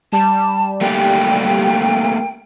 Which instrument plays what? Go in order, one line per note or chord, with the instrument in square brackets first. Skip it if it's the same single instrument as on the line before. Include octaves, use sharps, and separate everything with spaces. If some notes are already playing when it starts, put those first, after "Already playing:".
[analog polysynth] G3 [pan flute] A5
[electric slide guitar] A3 A#3 G4 [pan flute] G5